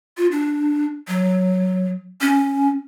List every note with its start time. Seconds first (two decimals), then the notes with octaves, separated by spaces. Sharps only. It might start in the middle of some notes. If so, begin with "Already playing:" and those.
0.17 F4
0.31 D4
1.08 F#3
2.21 C#4